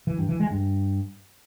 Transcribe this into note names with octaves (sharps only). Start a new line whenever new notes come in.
E3
G2
E3
G#3
G2